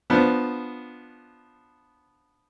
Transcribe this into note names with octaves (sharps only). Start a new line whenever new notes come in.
F3 B3 D4